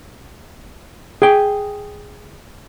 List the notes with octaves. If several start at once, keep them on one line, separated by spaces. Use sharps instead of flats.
G#4 G5